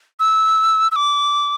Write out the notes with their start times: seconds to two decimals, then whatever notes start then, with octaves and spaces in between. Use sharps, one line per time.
0.20 E6
0.91 E6
0.96 D6